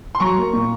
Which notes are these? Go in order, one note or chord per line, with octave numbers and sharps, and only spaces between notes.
C6
F#3 A#5 C#6
A#3
A#2